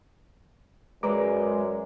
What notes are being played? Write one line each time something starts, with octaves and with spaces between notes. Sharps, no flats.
F#2 G#3 G#4 A#4 B4 D5 A#5 D6